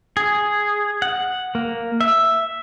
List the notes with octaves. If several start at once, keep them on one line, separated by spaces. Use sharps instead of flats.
G#4
F#5
A#3
E5